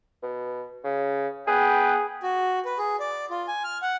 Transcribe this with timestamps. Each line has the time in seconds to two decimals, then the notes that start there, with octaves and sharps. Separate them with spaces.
0.22 B2
0.84 C#3
1.47 B3 G#4 B4 G5
2.23 F#4
2.65 B4
2.79 G#4
3.00 D5
3.30 F4
3.48 G#5
3.64 F6
3.82 F#5